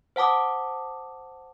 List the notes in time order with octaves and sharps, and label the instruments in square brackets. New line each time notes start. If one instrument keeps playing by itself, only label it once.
[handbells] C5 F#5 A5 D6 D#6